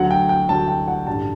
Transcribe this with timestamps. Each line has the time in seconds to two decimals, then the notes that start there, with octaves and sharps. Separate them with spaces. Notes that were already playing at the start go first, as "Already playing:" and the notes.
Already playing: D2 D3 F#3 F#5
0.11 G5
0.29 G5
0.48 D2 D3 F#3 A5
0.68 G5
0.88 F#5
1.07 A1 G2 D3 G3 A5